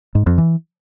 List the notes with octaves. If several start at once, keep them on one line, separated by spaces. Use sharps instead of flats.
G#2
F2
E3